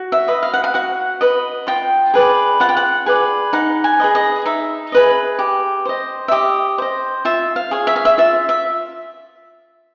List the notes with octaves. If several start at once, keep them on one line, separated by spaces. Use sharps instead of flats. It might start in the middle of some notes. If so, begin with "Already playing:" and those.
Already playing: F#4
E5
B4 D#5
F5
F#5
F5
F#4 F#5
B4 D#5
F4 G5
G#4 B4 D5
F4 F#5
G5
F#5
G#4 B4 D5
D#4 F#5
G#5
G#4 B4 D#5
D#5
D#4 E5
G#4 B4 D#5
G4
C5 D#5
E5
G4 D#5
C5 D#5
F4 E5
F5
G#4 C#5
E5
F5
E5
F4 E5
E5